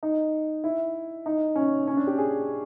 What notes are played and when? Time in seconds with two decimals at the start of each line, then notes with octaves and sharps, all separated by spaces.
0.03 D#4
0.64 E4
1.26 D#4
1.55 C#4
1.87 C#4
1.97 D4
2.07 G4
2.18 G#4